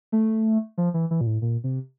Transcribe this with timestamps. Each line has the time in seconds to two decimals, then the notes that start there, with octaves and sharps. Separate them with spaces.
0.12 A3
0.78 F3
0.94 E3
1.11 E3
1.21 A#2
1.27 A2
1.42 A#2
1.64 C3